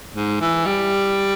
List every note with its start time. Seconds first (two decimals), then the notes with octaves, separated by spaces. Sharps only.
0.16 G#2
0.41 E3
0.66 G3